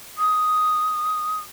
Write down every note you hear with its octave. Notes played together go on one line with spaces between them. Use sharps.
D#6